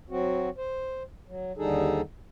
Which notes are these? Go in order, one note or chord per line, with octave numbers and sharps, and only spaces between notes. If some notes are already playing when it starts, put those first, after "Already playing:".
F#3 C4 F#4
C5
F#3
D#2 D3 G3 D#4 G#4 A4